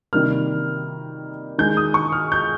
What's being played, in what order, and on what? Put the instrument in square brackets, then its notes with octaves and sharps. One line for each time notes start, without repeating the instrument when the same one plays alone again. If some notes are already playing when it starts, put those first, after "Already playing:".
[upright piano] C3 D#3 G3 A#3 F6
D#3 G#3 G6
D#6
C#6
F6
G6